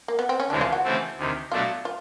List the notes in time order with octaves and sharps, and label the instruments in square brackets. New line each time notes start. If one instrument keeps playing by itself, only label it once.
[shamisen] A#3
B3
C4
C#4
[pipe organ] D2 C3 E3 G#3 [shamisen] D4
[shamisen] F4
F#4
[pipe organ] C#3 E3 A3 C4
D2 C3 D#3
[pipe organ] B2 F#3 A3 D4 F#4 [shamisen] F4
[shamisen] F4